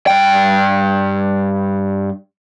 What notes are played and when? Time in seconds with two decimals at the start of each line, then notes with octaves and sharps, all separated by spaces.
0.07 G2 G5